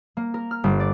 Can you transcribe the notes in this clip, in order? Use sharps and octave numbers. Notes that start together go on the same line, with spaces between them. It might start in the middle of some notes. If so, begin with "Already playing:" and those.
A#3
A#4
F6
G1
D5